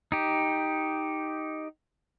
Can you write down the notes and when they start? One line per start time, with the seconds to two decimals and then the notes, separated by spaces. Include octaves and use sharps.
0.12 D#4 G4